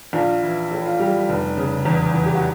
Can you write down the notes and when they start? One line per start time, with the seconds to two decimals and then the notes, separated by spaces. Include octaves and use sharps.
0.13 A#1 F4
0.43 E3 E4
0.71 A2
0.86 F4
1.00 G3 G4
1.29 F1
1.57 C#3
1.85 E2
2.14 E3
2.26 G4
2.35 F#4